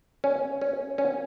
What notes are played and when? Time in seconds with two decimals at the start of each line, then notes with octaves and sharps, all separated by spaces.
0.24 C#4
0.61 C#4
0.98 C#4